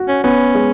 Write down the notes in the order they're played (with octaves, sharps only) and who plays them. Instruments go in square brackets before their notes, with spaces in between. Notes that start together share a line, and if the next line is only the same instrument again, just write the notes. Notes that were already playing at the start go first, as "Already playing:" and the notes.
Already playing: [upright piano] F#4
[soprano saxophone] C#4
[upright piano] B3 [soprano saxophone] C#4
[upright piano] G#3